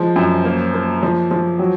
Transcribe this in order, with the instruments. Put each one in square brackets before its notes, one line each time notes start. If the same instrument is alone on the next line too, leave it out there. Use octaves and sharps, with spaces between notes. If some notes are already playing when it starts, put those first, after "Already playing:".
Already playing: [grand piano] F3 G#3
F#2
A#3
A#3
F3
F3
F#3